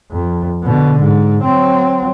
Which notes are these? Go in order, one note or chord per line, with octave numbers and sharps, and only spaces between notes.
F2
B2 D3
G#2
F#3 C4